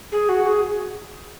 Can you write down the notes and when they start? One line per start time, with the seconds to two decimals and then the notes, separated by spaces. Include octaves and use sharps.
0.12 G#4
0.29 F#4
0.46 G#4